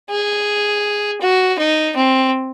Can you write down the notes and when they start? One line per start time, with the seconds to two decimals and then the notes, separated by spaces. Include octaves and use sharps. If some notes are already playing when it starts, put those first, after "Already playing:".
0.10 G#4
1.21 F#4
1.59 D#4
1.96 C4